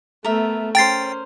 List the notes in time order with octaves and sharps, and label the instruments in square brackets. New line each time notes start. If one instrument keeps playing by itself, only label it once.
[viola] A3 B3 [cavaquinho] A#4 E5
[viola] C#4 [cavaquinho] A#4 C5 [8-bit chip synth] G5 A6 C7